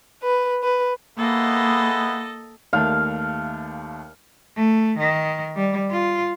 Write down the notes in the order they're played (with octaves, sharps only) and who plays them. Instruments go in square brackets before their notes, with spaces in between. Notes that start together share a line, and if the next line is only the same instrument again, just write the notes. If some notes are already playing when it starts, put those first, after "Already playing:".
[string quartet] B4
B4
[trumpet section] G#3 B3 E4 [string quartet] A#3 [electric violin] A4 D#5
[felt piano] D#2 D#3 A3 [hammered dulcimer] F5
[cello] A3
D#3
G3
F4